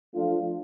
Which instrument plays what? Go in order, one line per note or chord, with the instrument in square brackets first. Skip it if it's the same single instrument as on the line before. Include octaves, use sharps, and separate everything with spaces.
[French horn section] F3 A3 D4 F4